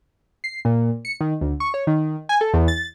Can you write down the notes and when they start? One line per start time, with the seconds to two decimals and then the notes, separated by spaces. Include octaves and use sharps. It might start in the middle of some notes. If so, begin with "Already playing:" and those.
0.44 C7
0.65 A#2
1.05 C#7
1.21 D#3
1.41 D2
1.60 C#6
1.74 C#5
1.87 D#3
2.29 G#5
2.41 A4
2.54 E2
2.68 A6